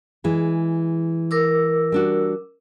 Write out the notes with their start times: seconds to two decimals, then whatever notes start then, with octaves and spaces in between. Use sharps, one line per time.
0.24 E3 G#3 G#4
1.31 A#4 D6 E6
1.92 G3 D4 F#4